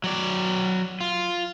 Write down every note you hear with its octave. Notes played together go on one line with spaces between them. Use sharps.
F#3 D5
F4